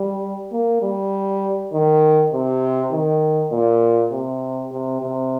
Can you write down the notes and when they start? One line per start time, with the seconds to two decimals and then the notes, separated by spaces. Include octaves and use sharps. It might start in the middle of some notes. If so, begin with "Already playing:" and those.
Already playing: G3
0.52 A#3
0.82 G3
1.73 D#3
2.32 C3
2.92 D#3
3.52 A#2
4.12 C3
4.72 C3
5.02 C3